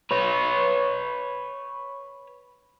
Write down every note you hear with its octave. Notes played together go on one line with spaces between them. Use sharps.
B4 C#5